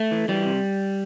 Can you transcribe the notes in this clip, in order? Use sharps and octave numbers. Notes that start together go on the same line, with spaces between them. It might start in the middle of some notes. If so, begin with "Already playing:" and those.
Already playing: A3
E3
E3 G3
C3